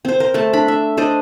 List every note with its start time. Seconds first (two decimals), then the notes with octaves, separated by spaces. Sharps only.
0.05 C4 C5
0.20 A#4 C5
0.34 A3 A5
0.53 D4 B5
0.68 E5
0.97 D4 C5 D5 D#5